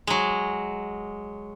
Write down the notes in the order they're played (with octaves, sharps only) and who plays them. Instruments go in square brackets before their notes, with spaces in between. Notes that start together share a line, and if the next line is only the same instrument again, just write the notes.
[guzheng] F#3 G#3